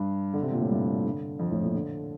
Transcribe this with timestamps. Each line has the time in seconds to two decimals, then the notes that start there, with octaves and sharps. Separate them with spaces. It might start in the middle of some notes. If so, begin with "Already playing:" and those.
Already playing: G2
0.34 D3
0.42 C3
0.52 A#2
0.61 A2
0.70 G2
1.04 D3
1.39 F2
1.51 A2
1.62 A#2
1.75 D3